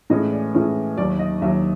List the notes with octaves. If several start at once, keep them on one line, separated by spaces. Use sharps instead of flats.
A2 E3 G#3 C#4 D#5
D5
A2 E3 G#3 C#4
D#2 D#3 F#3 D5
D#5
D#2 D#3 F#3 E5